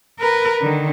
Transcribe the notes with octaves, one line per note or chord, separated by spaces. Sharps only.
A#4 B4
D3 D#3